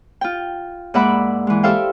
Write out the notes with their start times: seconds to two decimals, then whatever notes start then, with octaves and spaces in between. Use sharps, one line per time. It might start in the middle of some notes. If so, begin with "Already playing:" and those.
0.21 F4 G5
0.94 G#2 A#3 D5 E5 F#5 B5
1.47 E3 G#3
1.63 G4 A4 C5 E5 F5 G5